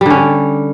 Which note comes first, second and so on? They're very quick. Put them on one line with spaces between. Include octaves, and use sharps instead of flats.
G3 D3 C#4